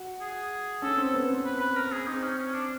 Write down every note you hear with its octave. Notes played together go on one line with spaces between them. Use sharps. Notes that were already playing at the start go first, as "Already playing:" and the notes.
Already playing: F#4
G#4
C#4 A4
C4
A4
B3
C4
B4
B4
A#4
G#4
C4 D#4
C#4
C#4
D4